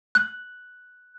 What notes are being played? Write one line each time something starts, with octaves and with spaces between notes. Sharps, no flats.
F#6